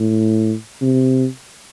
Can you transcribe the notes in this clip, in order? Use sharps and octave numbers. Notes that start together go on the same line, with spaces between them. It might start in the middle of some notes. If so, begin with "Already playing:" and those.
Already playing: A2
C3